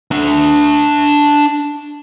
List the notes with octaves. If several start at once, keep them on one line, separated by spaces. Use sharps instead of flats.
D4 E5